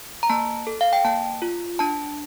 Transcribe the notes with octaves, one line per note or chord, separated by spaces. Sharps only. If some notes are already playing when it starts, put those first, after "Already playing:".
A#5
A#3 A5
A4
F5
G5
A#3 A5
F4
D4 A5